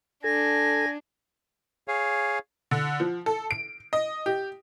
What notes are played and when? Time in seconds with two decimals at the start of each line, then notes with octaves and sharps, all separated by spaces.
0.24 D4 A4 G#5 A#6
1.88 G#4 C#5 F5
2.71 D3
3.00 F3
3.26 A4
3.51 D7
3.93 D#5
4.26 G4